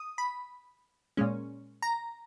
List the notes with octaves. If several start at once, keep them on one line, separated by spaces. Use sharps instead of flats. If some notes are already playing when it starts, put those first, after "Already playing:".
Already playing: D#6
B5
A#2 G#3 C#4
A#5